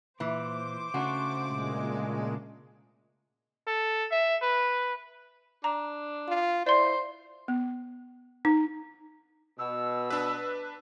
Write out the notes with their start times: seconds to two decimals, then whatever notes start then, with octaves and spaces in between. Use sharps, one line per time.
0.20 A#2 E3 C5 D6
0.94 C#3 A3 D4 F#4
1.46 A#2 G#3
3.67 A4
4.11 E5
4.42 B4
5.64 D4 A#5
6.28 F4
6.67 E4 C5 D5 C6
7.48 B3
8.45 D#4
9.59 B2 E6
10.10 D4 B4